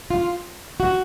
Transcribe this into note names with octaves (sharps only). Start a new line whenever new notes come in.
F4
F#4